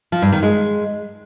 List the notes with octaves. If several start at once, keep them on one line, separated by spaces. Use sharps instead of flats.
F3
G2
D#3
G#3